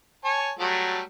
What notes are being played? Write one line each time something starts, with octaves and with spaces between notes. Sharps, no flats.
C#5 G#5 A5
F#3 G3 A3